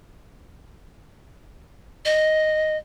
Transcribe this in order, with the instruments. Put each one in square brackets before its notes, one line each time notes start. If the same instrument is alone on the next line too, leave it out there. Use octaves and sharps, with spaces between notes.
[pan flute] D#5